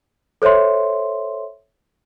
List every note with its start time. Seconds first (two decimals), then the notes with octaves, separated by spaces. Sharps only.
0.42 A4 C5 C#5 E5 C6